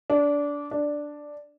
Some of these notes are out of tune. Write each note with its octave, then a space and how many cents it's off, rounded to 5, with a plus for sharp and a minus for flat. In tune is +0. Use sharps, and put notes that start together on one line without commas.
D4 -20
D4 +0